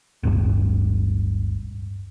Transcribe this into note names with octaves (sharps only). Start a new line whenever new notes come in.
D1 G1 G2